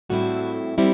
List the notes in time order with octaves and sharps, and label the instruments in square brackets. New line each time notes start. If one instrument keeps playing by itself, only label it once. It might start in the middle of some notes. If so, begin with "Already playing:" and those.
[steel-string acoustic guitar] A2 G3 C4 E4 F#4 A4
G3 C4 E4